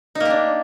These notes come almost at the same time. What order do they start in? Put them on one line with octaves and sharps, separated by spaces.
D#4 A#3 G4 D4